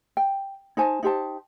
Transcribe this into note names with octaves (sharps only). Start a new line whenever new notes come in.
G5
D#4 C5 G#5 A5
D#4 G4 C5 A5